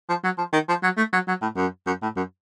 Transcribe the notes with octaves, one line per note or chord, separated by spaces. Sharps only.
F3
F#3
F3
D#3
F3
F#3
A3
F#3
F#3
A2
F#2
F#2
A2
F#2